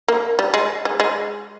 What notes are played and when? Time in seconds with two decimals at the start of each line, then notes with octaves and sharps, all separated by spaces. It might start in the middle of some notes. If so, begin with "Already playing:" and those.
0.08 A#3
0.39 G3
0.54 G#3
0.85 G#3
1.00 G#3